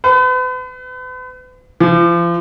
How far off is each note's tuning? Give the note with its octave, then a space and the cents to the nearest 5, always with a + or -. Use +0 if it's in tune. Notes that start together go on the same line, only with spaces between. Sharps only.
B4 +40
F3 -35